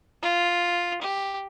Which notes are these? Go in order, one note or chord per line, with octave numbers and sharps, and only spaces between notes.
F4
G4